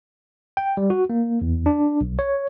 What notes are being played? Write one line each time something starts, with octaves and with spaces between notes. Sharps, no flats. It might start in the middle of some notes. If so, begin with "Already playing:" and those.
G5
G3
F#4
A#3
E2
D4
B1
C#5